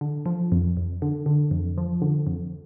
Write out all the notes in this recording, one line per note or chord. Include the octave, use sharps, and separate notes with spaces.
D3
F3
F2
F2
D3
D3
F2
F3
D3
F2